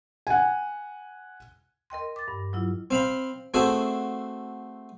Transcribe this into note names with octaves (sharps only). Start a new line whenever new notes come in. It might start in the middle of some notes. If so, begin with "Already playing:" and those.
F#5 G#5
A#4 D#5 G5 C6
D6 A6
G2
F#3 E4 F4
C4 F5 B5
A3 C4 F#4 G#4 E5